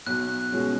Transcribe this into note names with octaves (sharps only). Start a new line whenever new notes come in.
B1 F#6
B2 G#3 C#4